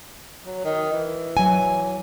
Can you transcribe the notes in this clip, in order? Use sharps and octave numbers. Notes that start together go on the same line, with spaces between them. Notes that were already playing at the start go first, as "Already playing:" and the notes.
F#3
D#3
E3
F#3 G#5